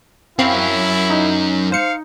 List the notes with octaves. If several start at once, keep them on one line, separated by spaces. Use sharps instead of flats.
F#2 C4 E4 C#5 F5 B5
D#4
C5 F5 C#7